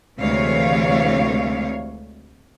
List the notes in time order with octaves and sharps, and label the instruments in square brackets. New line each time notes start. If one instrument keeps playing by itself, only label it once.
[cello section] D2 C3 E3 G#3 C#5 F5